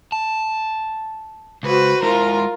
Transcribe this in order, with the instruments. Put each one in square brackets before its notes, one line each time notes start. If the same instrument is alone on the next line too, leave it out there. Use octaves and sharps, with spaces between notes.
[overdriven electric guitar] A5
[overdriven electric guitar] C#2 [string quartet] F#4 B4 C5
[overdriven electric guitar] G#3 E4 [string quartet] F4 A#4